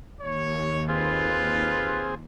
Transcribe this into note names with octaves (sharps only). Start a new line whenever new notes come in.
D#2 C#5
C4 F4 G#4 B4